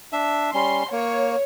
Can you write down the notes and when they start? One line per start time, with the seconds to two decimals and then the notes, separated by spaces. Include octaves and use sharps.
0.12 D4 E5
0.54 G3 C#4 C6
0.92 A#3 C#5